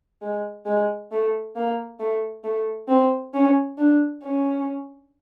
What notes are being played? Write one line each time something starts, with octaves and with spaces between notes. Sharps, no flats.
G#3
G#3
A3
A#3
A3
A3
C4
C#4
D4
C#4